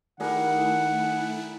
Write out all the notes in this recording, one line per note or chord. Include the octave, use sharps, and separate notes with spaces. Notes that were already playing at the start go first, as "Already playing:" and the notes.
D#3 G3 A3 E4 G#4 A#4 F#5